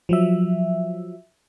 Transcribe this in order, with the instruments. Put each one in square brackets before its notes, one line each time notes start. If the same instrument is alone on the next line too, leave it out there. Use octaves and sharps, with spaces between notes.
[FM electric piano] F3 F#3 E5